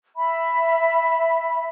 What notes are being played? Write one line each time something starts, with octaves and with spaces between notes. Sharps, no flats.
E5 B5